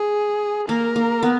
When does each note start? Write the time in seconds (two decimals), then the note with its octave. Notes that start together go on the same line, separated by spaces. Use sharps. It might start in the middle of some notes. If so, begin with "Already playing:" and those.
Already playing: G#4
0.69 A#3 A#4
0.96 A#3
1.23 B3